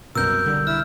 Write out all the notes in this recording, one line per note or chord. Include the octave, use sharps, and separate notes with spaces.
C2 F#2 B2 A#4 E6 G6
B1 D3 G3
E4 E6 F6